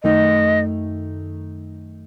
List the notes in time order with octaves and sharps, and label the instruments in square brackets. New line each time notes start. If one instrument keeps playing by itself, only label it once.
[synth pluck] F#2 D#3 A3 D#4 [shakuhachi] D#5